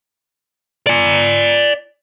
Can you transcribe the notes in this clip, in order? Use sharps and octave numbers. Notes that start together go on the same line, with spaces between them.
D5 G#5